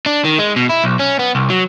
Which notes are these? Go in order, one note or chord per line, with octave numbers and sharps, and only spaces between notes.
D4
D#3
G#3
B2
E4
B1
C#4
B3
C2
F#3